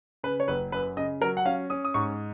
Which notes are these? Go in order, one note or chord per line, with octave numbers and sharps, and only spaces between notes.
C#3 B4
C#5
F#1 B4
F#2 B4
C#3 D#5
F#3 A#4
F#5
C#4 F5
C#4 D#6
D#6
G#2 C#6